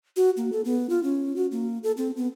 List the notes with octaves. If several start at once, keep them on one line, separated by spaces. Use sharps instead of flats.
F#4
A#3
A4
B3
F4
C#4
F#4
A#3
A4
C4
B3